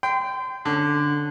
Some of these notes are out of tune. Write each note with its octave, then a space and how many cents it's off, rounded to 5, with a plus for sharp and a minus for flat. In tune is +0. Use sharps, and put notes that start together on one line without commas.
G5 +0 C6 -35
D3 +0 C#4 -5